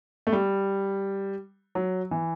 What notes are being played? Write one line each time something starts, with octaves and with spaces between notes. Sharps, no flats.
A3
G3
F#3
E3